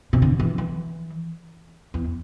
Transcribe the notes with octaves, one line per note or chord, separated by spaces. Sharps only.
C3
D3
E3
E3
E2